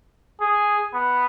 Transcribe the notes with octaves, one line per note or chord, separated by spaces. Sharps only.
G#4
B3